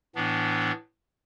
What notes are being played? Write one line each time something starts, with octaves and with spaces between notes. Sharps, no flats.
A2 E3 B3 D4